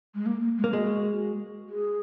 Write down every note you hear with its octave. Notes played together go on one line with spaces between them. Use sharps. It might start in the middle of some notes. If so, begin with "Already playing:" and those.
G#3
A#3
A#3
G#3
A#3
G#3 F#4
G#4